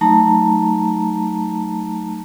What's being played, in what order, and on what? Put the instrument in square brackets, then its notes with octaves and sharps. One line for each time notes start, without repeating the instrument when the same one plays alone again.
[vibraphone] F#3 A3 D#4 A5 A#5